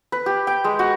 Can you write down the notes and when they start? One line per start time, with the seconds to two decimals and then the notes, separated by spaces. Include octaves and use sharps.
0.12 B4
0.26 G4
0.47 G5
0.64 G#3
0.79 F#4